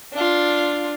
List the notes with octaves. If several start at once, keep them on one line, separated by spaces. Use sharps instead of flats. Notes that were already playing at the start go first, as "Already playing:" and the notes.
D4 F4